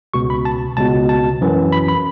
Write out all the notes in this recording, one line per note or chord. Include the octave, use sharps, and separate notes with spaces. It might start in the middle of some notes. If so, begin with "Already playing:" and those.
C#2 B2 C#6
B5
A5
C#2 B2 A5
A5
F#2 E3
B5
B5